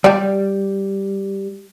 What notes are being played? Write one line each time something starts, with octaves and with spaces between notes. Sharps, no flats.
G3 G4 D5